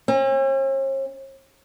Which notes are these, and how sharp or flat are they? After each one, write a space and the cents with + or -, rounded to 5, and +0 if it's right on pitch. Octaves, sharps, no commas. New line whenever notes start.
C#4 -45